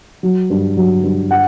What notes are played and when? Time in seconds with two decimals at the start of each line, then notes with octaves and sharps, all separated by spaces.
0.23 F#3
0.50 G2
0.77 F#3
1.03 G2
1.31 F#5